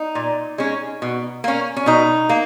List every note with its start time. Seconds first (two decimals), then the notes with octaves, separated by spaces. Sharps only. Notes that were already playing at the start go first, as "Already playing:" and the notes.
Already playing: D#4
0.15 A#2
0.58 G#3 C#4
1.02 B2
1.44 A#3 C#4
1.77 C#4
1.86 B2 D#4
2.29 A#3